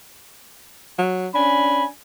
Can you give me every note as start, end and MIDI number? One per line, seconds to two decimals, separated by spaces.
0.98 1.27 54
1.35 1.85 61
1.35 1.90 62
1.35 1.85 80
1.35 1.85 83